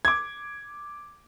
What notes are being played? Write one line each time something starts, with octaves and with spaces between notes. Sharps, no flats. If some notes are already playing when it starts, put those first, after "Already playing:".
D6 G#6